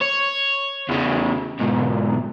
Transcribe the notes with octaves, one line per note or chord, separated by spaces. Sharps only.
C#5
E2 C#3
B1 G#2